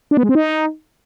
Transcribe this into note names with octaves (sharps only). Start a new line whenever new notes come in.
D4
B3
G#3
C4
D#4